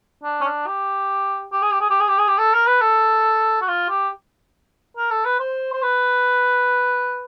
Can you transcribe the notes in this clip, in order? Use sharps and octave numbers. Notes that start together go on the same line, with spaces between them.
D4
C#4
D4
G4
G4
G#4
G4
G#4
G4
G#4
G4
G#4
G4
A4
A#4
B4
A4
F#4
F4
G4
A#4
A4
B4
C5
C5
B4